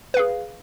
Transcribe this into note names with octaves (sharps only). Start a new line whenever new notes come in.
G#4 B4 F5